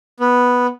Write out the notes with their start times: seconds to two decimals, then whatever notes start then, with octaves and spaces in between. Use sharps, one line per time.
0.20 B3